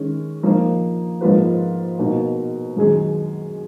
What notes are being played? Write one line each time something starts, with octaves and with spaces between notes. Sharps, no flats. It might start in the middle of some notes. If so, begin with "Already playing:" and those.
Already playing: D#3 G#3 C#4
F3 A#3 D#4
G#2 F3 A#3 F4 B4
B2 A#3 D#4
F#2 D#3 G#3 D#4 G#4